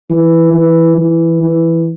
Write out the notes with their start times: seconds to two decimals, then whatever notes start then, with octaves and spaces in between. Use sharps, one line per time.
0.10 E3
0.54 E3
0.98 E3
1.43 E3